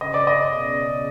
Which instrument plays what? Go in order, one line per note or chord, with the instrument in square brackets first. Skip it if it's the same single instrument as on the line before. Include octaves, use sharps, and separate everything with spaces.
[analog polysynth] C#3 [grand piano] D#5
[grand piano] D5
[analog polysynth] C#3 [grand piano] D#5
[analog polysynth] B2
B2